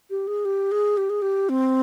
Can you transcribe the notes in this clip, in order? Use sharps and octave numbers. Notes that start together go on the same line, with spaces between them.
G4
G#4
G4
G#4
G4
G#4
G4
C4